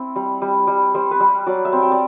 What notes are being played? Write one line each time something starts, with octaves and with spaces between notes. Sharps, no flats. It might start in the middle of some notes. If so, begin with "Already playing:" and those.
Already playing: C4 E4
G3
G3
G3
G3 C5
B4
G3
F#3 D5
E5
C4
G5
D5